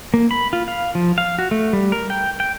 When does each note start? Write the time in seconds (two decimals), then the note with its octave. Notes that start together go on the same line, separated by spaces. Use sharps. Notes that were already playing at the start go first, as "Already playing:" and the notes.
0.14 A#3
0.31 B5
0.53 F4
0.68 F5
0.95 F3
1.18 F5
1.39 F#4
1.51 A3
1.73 G3
1.92 A#4
2.10 G5
2.40 G5